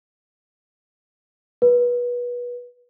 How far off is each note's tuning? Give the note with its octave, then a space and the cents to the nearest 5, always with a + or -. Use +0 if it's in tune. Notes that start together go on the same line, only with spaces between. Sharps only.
B4 -25